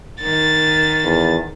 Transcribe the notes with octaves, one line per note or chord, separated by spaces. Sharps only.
D#3 A6
E2